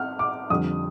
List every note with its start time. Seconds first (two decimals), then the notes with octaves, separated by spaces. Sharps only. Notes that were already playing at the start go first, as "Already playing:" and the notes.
Already playing: F6
0.19 D6
0.50 F2 D3 G3 D#6